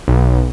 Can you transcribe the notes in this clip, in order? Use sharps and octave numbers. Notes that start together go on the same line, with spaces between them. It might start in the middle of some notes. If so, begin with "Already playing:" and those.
B1